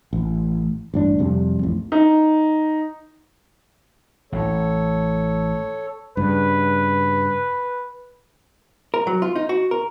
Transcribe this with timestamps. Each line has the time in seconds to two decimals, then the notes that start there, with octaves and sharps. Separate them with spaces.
0.13 A1
0.94 A1 G2 D4
1.19 F2 C3 G3
1.59 A1 F2
1.92 D#4
4.32 A1 A2 A4 C#5
6.17 G2 C#3 B4
8.94 A#4
9.07 F#3
9.22 F4
9.36 D#4
9.49 F#4
9.71 A#4